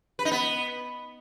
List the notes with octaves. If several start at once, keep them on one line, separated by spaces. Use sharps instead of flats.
B4
D#4
B3